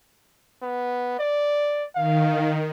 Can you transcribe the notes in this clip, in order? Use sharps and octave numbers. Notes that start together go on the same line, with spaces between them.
B3
D5
D#3 F5